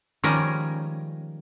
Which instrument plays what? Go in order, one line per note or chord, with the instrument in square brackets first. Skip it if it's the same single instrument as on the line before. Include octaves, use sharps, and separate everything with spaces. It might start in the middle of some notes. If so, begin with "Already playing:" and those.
[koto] D#3 F3 G3 G#3 C#4 A#4